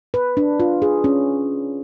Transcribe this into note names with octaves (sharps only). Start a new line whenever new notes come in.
B4
D4
F4
G#4
C#4